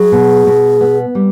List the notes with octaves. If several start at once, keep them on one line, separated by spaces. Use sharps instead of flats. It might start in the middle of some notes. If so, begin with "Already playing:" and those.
Already playing: F#3 G#4
B2
B2
B3
G3